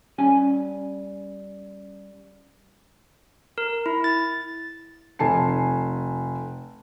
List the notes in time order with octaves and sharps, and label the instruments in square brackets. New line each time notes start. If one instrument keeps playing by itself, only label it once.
[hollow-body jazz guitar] G3 C#4 G#5
[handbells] A#4
E4
A6
[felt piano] F1 G#5 A5 C7